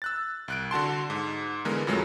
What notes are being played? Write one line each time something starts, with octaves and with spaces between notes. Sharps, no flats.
E6 F#6 A6
C2 F#6 D7
D3 F#4 A5 C6
G#2
D3 E3 G#3 B3 A#4
F2 A#2 F#3 G#3 A3